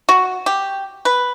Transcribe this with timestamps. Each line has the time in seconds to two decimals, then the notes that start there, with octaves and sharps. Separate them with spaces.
0.09 F#4
0.46 G4
1.05 B4